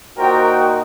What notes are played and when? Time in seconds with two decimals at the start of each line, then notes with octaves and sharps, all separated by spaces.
0.17 A#2 D#4 F#4 A#4 C5 G5